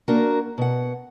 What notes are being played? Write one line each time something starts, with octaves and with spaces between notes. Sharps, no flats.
A#3 D4 F#4 A#4
B2 F#5